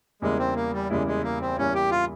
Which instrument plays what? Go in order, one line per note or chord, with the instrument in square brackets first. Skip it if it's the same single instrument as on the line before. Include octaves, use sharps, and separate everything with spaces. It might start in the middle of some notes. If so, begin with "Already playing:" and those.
[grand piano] E2 C#3 G3 A#3 E4 [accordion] G#3
[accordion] C4
A#3
G3
[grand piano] E2 C#3 G3 A#3 E4 [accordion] G#3
[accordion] G#3
A#3
C4
[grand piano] E2 C#3 G3 A#3 E4 [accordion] C#4
[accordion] G4
F4